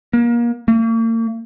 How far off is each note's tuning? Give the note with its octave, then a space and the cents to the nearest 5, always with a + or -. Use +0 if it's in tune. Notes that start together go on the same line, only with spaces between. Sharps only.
A#3 +30
A#3 -45